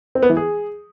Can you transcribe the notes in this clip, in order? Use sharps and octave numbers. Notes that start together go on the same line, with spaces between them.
C4
B3
E3
G#4